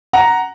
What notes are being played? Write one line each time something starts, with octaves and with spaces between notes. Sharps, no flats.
F#5 A#5